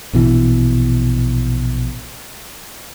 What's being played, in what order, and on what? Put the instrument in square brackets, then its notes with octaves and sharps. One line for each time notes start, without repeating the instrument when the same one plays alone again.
[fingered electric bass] A#1 B2 E3